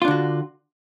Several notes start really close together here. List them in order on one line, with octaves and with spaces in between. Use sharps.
F4 D4 D3 F#4